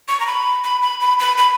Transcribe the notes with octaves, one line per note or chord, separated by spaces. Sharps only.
C#6
A#5
B5
B5
B5
B5
B5
B5